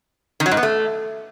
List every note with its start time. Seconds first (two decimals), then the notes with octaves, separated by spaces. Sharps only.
0.40 D#3
0.46 F#3
0.51 G#2
0.57 B3
0.63 A3